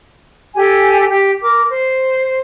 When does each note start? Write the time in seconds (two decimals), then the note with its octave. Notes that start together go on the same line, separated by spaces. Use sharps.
0.55 G4 A4 G#5
1.09 G4
1.41 A#4 D6
1.69 C5